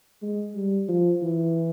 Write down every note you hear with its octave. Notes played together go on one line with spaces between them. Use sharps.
G#3
G3
F3
E3